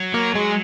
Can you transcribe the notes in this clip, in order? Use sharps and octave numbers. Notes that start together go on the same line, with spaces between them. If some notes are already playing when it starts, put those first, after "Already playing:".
Already playing: F#3
A#3 A#4
G#3 G#4